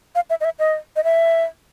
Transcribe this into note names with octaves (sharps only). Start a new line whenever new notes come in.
F5
E5
D#5
E5
D#5
D#5
E5